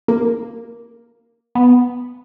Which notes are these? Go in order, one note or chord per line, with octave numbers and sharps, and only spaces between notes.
A#3
B3